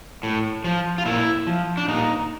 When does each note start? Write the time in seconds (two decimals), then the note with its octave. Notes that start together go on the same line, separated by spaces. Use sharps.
0.23 A2
0.64 F3
0.98 F4
1.05 A#2 E4
1.47 F3
1.78 D4
1.88 A#2 D#4